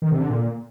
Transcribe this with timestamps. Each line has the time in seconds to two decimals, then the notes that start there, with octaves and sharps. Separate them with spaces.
0.02 D#3
0.11 C3
0.20 D3
0.29 A#2